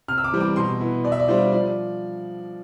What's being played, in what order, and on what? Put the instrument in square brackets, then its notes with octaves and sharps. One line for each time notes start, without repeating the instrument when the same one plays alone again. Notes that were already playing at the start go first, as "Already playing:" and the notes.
[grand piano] C3 F6
E6
D6
E3 G3 C4
D6
B2 C6
B3 E4
B2 D5
E5
D5
G3 D4 F4 C5
F3 D5